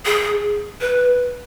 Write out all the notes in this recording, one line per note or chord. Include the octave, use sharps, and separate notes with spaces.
G#4
B4